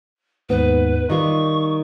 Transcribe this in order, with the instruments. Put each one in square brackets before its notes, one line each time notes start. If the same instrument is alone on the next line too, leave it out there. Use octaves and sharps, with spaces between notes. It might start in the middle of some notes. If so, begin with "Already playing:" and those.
[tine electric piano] D#2 G#2 B3 [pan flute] B4
[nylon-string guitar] D#3 G3 F4 [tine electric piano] D#5 [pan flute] C#6